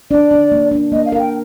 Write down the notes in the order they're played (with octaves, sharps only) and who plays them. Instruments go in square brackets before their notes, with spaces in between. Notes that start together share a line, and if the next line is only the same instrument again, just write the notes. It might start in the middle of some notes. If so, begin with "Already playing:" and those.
[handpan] D4 [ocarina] D5
[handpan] D4
A#3
D4
[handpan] A#3 [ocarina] D#5
[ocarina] F5
[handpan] A#4
[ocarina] G5